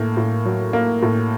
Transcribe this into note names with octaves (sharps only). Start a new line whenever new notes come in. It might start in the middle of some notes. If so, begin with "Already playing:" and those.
Already playing: A2 A#3
A2
F#3
A#3
A2